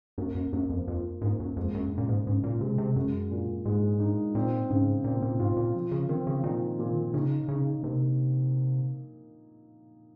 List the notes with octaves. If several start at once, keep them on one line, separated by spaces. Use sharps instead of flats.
F#2 A#3
F#2
F#2 A#3
F2
F2 F4
G#2 A#3
F#2
F2 G#3
F#2
C#3
A#2
G#2
G#2 C#3
A#2
C3 G#3
C3
F#2 G#3
A#2
G#2 G#3
D#4
A#2 C4
G#2 C#3
A#2 C4
A#2
G#2 F4
A#2
F3
C#3
D#3 C4
C#3
A#2 D#3
A#2
C#3 D#4
C#3 D#4
C3 A#3